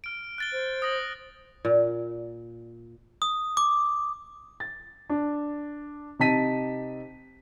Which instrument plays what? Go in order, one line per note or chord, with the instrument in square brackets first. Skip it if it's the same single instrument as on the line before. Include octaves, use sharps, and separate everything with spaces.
[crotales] F6 D7
F#6 A6 G7
[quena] C5
[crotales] D#6 A#6 F#7
[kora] A#2
[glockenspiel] D#6
D6
[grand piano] A6
D4
C3 D#4 A5 B6 D#7